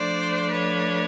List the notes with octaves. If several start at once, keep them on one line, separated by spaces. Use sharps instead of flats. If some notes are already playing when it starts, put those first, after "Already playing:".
Already playing: F3 A3 D4 C5 D5
B4 C#5